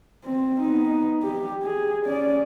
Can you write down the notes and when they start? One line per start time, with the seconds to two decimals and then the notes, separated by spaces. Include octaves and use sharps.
0.25 C4
0.60 B3 D#4
1.23 G4
1.63 G#4
2.05 C#4 D5